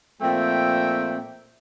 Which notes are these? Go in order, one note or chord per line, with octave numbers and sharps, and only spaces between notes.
A#2 F3 A3 C4 E5 G5